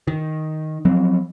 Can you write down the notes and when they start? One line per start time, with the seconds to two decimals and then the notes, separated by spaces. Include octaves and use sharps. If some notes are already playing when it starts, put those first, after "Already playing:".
0.08 D#3
0.85 F3 F#3 C4